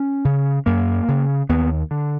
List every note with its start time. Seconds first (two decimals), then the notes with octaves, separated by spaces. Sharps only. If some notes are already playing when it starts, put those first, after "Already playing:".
Already playing: C#4
0.25 C#3
0.66 F#2 A#3
1.08 C#3
1.49 D#2 B3
1.91 D3